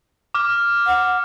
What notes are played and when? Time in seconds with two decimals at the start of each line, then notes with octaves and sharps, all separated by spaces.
0.34 D6 F6
0.87 F#5